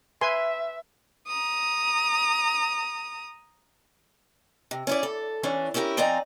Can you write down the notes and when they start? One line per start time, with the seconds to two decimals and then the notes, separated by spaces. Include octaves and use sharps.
0.21 B4 E5 G#5 C6
1.27 A#5 D#6
4.71 C3
4.87 C#4 E4 D5
5.03 A4
5.43 E3 C#4 D4
5.74 C#4 E4 G4 A4 A#4
5.97 F3 C4 D#4 D5 G#5 A#5